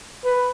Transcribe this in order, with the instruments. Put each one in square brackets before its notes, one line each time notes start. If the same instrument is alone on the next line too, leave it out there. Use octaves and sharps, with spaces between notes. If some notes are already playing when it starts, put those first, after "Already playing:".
[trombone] B4